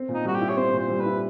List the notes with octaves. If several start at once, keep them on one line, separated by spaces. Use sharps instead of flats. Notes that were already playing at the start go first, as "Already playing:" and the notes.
Already playing: C4
A#2
D#4
G3 F#4
G4
E4
C#5
C4 C5
A#2
C5
G3
B4
E4